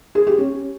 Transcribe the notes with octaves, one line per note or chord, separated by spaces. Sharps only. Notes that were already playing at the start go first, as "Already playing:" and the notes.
G#4
G4
C#4